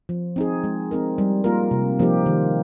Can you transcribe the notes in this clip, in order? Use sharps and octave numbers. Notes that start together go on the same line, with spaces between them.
F3
C4 D#4 G#4
G#3
C4 D#4 A#4
G3
A#3 F4 A#4
C3
F3 A#3 D#4 G4
D#3